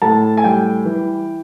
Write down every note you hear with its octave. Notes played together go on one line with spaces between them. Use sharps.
A2 A5
G#5
G3 G5
E3